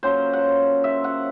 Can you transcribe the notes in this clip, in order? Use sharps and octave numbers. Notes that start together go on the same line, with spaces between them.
F#3 A#3 C#4 F4 C5
F#5
E5
F#5